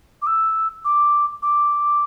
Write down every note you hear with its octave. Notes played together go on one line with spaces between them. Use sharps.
D6
E6
D6
D6